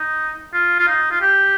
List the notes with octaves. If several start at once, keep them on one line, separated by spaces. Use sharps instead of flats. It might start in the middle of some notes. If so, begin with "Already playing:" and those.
Already playing: D#4
F4
F4
D#4
F4
G4